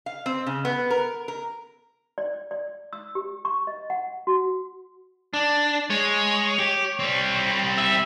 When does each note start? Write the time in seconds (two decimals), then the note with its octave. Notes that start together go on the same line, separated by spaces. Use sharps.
0.06 F5
0.26 C4
0.46 C#3
0.65 B3
0.90 A#4
1.28 A#4
2.18 D5
2.51 D5
2.93 E6
3.15 G4
3.45 C#6
3.67 D#5
3.90 F#5
4.27 F#4
5.34 D4
5.90 G#3 C#5
6.59 G4
6.99 G3 C4
7.78 E5